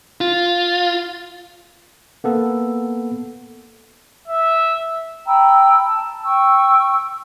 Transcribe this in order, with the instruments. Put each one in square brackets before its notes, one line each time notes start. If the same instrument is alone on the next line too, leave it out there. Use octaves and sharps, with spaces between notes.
[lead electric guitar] F4
[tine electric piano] A#3 B3 A4
[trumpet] E5
[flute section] G5 A#5 B5 E6
A5
G5 C#6 E6